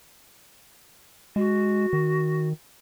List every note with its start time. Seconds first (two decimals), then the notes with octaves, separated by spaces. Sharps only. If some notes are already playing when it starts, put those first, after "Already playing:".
1.36 G#3 F#4
1.93 D#3